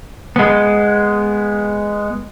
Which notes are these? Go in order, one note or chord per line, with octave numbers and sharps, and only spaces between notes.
G#3 B3